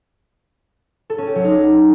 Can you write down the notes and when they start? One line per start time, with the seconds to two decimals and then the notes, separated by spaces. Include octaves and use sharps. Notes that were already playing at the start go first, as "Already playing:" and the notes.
1.10 A4
1.18 C#4
1.27 G4
1.35 F#3
1.44 D#4